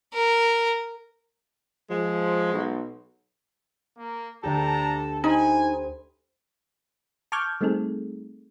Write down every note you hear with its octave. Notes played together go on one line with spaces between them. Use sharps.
A#4
F3 G#3
B1
A#3
D2 D4 G4 A4 A#5
D#4 G4 C5 G#5 B5
A5 C#6 D6 F6 G6 G#6
G3 A3 C4 D#4 G#4 A4